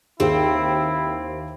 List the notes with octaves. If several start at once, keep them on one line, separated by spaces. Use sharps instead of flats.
D#2 C4 E4 G#4